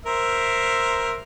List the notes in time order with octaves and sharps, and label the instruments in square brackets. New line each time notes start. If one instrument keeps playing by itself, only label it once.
[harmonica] A#4 C5 E5